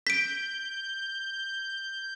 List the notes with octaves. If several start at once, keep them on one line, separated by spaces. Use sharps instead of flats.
G6 B6 D7